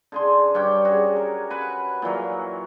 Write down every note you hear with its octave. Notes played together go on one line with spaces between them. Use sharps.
D3 G#4 C6
G2 C#4 D4 G5
F#4 G#4
A#4
B4 F#5 G#5
A#2 E3 F#3 A#4